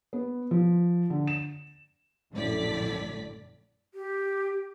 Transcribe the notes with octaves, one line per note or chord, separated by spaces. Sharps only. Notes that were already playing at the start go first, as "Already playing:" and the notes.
B3
F3
D3
E7
A#1 F#2 A2 D3 D5 B6
G4